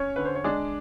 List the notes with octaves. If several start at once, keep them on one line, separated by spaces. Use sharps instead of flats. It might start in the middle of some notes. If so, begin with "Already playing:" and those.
Already playing: C#4 C#5
D3 B4
C5
C#5
G#3 D4 D5